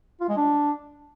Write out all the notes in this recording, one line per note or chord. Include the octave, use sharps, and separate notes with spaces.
F4
G#3
D4